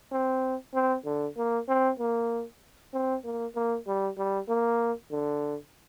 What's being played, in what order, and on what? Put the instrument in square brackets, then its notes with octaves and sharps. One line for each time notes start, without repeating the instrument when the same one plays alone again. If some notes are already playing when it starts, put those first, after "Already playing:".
[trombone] C4
C4
D3
A#3
C4
A#3
C4
A#3
A#3
G3
G3
A#3
D3